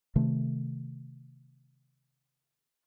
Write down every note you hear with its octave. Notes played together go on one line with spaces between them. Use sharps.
C3 D#3 A3